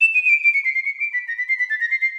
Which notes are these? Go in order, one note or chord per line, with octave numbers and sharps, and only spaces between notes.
E7
D#7
D#7
D7
D7
C#7
C7
C7
C#7
D7
B6
A#6
B6
C7
B6
A6
A#6
C7
C7